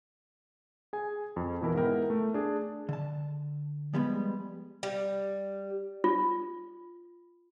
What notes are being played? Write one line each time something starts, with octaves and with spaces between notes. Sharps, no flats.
G#4 G#5
F2
B2 E3 E4 A#4
G#2 B3 E4 A#4 G5
A3
D4 G#4
D3 A5
F3 G3 G#3 B3
G3
F4